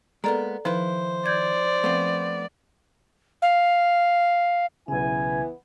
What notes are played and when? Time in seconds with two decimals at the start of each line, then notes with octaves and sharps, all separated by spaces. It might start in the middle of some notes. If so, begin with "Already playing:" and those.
0.24 G#3 A#3 B3 A4 D5 A#5
0.65 D#3 F3 E4 B4 C5
1.26 D5 G6 G#6
1.84 F3 A3 B3 C4
3.42 F5
4.88 B1 C#3 E3 B3 E4 G#5